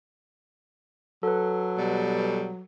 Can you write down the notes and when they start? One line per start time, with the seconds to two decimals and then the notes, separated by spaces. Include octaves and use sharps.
1.23 F#3 A4 B4
1.78 B2 G3